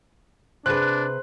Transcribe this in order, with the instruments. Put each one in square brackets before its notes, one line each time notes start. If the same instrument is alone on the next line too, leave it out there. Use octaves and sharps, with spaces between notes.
[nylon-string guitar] C3 G#4 B4 [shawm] D4 [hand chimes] C5 C6 [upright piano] F#6